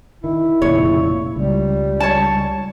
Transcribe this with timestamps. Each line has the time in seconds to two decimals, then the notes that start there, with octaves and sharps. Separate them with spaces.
0.24 D#3 E4
0.62 F1 A#2 C#3 C#5
1.36 C#2 G3
2.00 C#5 A5